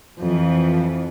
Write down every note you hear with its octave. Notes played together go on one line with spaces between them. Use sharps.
F2 E3 F3